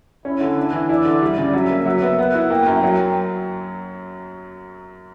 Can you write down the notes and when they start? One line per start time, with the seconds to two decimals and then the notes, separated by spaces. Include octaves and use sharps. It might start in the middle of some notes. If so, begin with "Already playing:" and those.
0.25 C#4 E4
0.41 D3
0.58 D4
0.73 E3
0.89 E4 D5
1.05 D3
1.22 G3
1.38 C#3
1.53 F#3 E5
1.70 A#3
1.86 F#3 E5
2.02 B3
2.19 B3 F#5
2.35 E4
2.50 A#3 G5
2.66 F#2
2.83 F#3